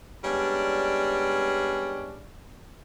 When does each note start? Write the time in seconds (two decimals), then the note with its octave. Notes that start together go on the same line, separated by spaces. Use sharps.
0.24 G3 G#3 B3 C#4 D4